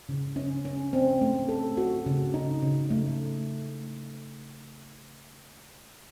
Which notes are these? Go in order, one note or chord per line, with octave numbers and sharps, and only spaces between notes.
C#3
C#4
C#4
C4
A3
A4
F#4
C#3
D#4
C#3
A3